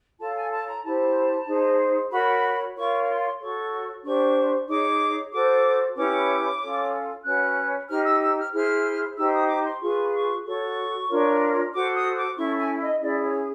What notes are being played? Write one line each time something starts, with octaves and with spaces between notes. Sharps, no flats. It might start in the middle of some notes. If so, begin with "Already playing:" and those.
F4 A4 C#5 A5
G#5
A5
A#5
E4 G4 C5 A5
D#4 G#4 C5
F#4 A#4 C#5 B5
F4 A#4 C#5 C#6
C6
F#4 A4 C#5 C#6
D4 G4 C5 C#6
D#4 G#4 C#5 D6
F#4 A4 C5 D6
C#4 E4 G4 B4 D6
C#4 F4 A4 C#5
C#4 F#4 B4 F#6
D#4 G4 C5 F6
E6
E6
F6
E4 G#4 C5 F6
D#4 G4 C5 E6
D#6
D6
C6
F4 G#4 B4 C#6
C#6
F#4 A4 C#5 C#6
D4 F4 A#4 C#5
F#4 A4 C5 D6
D#6
D6
C#4 E4 A4 C#6
G#5
D#5
C#4 E4 G#4 D5
C#5